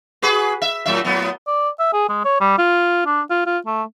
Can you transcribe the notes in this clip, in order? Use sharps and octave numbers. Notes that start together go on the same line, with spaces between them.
F#4 G#4 B4
E5
A2 F#3 E5
A2 F#3 B3
D5
E5
G#4
G#3
C#5
G3
F4
D4
F4
F4
A3